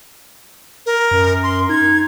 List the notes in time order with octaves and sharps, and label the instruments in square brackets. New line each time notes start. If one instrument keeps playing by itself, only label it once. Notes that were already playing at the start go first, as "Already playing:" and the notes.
[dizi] A#4
[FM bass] F#2
[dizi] C6
[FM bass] D#4 [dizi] G#6